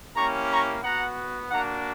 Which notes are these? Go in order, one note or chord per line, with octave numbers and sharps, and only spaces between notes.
A#3 C#4 E4 G4 A#5 C#6
A#5 C#6
B3 F#4 F#5 A#5
A#3 D4 F#4 F#5 A#5